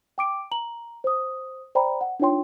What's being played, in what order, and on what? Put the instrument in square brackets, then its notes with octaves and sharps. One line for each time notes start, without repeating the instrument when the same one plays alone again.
[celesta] G5 D6 D7
A#5 F#7
C5 D#6
C5 D5 G5 A#5 B5
F#5
D4 D#4 F4 C#5 G5 C6